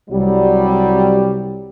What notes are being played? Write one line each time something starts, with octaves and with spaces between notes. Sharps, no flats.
C2 F#3 G3